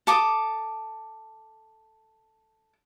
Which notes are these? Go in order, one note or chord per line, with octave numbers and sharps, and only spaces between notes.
A4 D6 D#6